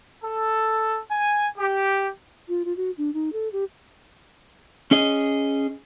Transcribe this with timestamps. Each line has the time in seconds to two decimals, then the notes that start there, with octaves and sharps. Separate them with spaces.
0.24 A4
1.12 G#5
1.59 G4
2.49 F4
2.65 F4
2.77 F#4
2.98 D4
3.14 D#4
3.33 A4
3.53 G4
4.91 C#4 G#4 D#5